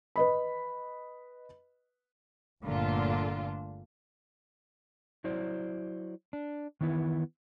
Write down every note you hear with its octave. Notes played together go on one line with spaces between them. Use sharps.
B4 D#5 B5
G1 A#2 D3 A3 D4 F4
F#3 E4 C5 D5
D4
D#3 E3 B3 E4